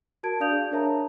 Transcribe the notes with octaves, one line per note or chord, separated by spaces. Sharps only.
F#4 A#4 A5 G#6 D7
D4 D5 F5 D#6 G6 F7
G#4
D4 A#4 C#5 E5 A5 A#5